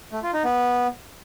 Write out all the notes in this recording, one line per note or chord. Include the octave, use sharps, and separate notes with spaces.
A3
F4
D#4
B3